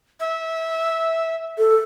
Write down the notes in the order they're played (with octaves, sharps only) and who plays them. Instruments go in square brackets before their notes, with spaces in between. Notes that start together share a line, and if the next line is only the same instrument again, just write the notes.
[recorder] E5
[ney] A4